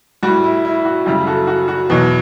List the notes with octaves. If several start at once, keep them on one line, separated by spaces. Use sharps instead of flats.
A2 G3 F#4
E4
E4
F#4
F#2 C#3 G3 E4 G4
F#4 A4
F#4
F#4
E2 B2 F#3